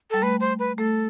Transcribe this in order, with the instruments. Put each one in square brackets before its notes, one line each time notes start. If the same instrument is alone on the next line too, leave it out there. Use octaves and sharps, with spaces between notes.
[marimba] G3 [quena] A4
[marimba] A3 [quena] B4
[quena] C5
B4
[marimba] A3 [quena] A4